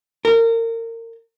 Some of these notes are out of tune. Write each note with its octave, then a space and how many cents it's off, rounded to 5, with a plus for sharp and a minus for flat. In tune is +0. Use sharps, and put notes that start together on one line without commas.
A#4 -30